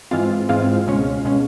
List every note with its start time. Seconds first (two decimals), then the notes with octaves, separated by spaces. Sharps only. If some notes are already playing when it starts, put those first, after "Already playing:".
0.11 G#2 E3 G#3 C4 F4 F5
0.49 G#2 E3 G#3 C4 F4 F5
0.87 C#2 B2 G#3 C#4
1.25 B2 G#3 C#4